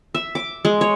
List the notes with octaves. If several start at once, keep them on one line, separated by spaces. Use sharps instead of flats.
E5
D6
G#3
C#5